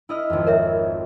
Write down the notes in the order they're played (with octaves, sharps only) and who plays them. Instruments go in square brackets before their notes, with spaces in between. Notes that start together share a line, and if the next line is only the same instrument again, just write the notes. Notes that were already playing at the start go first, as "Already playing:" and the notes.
[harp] E4 D#5 F6
G#1 F2
[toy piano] A#4 C#5 E5